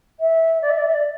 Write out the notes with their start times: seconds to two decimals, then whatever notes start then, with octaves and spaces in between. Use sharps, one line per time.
0.20 E5
0.62 D5
0.70 E5
0.78 D5
0.86 E5
0.94 D5